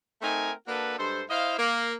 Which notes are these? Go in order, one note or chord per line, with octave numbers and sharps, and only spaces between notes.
A3 C4 D#4 A#4 G#5
A#3 D4 F#4 A4 B4
G2 G#3 A4 C5
E4 C5 D#5 F5
A#3